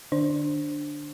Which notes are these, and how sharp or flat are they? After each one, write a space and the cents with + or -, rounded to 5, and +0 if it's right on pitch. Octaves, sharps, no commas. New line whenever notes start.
D3 +45 D4 +0 C5 +15